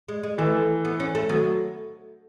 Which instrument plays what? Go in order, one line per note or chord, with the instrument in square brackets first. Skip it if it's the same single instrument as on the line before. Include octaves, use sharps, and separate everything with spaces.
[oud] G#3
G#3
[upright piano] E3 [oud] A3
[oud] B3
C#4
A3
[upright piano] F#3 [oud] B3